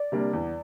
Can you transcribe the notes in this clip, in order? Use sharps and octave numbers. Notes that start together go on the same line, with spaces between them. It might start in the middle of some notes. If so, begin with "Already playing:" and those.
Already playing: D5
C3 G3 A#3 D4
E2